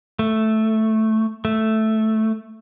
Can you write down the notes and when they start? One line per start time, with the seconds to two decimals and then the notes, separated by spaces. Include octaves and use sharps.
0.19 A3
1.45 A3